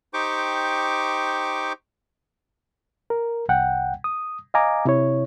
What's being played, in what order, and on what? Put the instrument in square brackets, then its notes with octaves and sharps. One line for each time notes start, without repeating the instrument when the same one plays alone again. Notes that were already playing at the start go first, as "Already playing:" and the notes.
[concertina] D#4 G4 C5 G5 C#6 D6
[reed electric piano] A#4
C2 F#5 G5
D#6
D#5 F5 G#5 A#5 D6
C3 E4 C#5